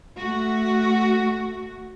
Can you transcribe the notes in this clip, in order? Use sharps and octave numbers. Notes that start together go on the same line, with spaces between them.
A3 F#4